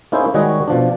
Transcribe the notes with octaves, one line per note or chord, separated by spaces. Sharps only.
A#3 C#4 D#4 E4 G#4 C5
D#3 G3 G#3 F#4 C#5 D#5
B2 F3 D4